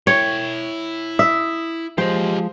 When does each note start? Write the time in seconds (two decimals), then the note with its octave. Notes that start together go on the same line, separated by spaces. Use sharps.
0.07 E4 C#5 G5
1.19 E5 D#6
1.98 F3 G#3 G4 C5 D#5